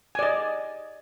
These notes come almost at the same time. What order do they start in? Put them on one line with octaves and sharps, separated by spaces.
G#5 D5 D#5